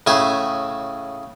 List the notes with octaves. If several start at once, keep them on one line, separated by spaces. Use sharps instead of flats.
A2 C#3 G#4 E5 G#5